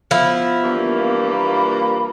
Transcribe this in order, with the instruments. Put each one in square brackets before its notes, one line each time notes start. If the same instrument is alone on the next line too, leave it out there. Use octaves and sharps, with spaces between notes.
[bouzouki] F3 E4 [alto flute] B3
[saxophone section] G2 E3 A#3
[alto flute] B5